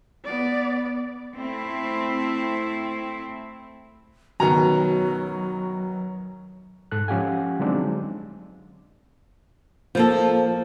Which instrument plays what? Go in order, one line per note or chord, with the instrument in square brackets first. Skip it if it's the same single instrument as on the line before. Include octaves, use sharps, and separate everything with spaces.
[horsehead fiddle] B3 D5
[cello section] A3 C4 E4
[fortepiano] F#2 B2 D#3 [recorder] F#3 [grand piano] A#5
[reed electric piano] G#2 A4 F#6
F3 C#4 G4 F5 F#5 G#5
D3 F#3 G#3 C4 D4 D#4
[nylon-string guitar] F3 A#3 A4